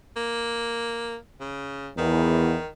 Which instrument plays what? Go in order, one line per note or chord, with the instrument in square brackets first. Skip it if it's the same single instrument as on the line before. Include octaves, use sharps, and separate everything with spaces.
[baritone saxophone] A#3
C#3
[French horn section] E2 [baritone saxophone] D#3